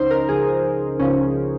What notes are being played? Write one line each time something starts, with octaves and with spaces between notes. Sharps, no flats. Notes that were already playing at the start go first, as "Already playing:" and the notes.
Already playing: C#2 C#3 F3 C#4 D#4 C5
A#4
C#2 C#3 F3 G#4
C#2 C#3 F3 C#4